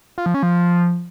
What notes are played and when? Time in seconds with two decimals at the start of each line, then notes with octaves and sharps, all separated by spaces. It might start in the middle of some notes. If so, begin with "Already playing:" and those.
0.18 F4
0.26 F3
0.34 C#4
0.43 F3